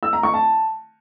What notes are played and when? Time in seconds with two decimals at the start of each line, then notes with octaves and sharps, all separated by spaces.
0.03 E6
0.13 A#5
0.23 C#6
0.34 A5